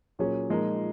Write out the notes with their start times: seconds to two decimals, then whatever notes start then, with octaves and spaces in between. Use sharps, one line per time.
0.19 A#2 F#3 C#4 G#4
0.49 A#2 F3 G#3 D#4 A#4